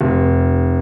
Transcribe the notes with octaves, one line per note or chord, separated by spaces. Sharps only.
F1